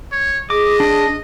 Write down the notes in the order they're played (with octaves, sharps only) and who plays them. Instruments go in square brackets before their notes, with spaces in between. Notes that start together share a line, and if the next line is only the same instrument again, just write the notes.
[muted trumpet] C#5
[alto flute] G#4 [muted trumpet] D#5 [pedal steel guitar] D6
[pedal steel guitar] D4